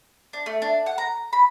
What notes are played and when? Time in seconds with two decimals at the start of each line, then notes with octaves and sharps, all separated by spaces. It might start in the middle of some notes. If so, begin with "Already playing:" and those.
0.33 D4
0.46 A3
0.62 D4
0.86 F#5
0.98 A#5
1.33 B5